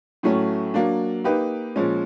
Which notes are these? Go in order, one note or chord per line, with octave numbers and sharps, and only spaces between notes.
A2 F#3 A3 C#4
F#3 A#3 D4
A#3 D#4 G4 B4
A#2 F3 G#3 C#4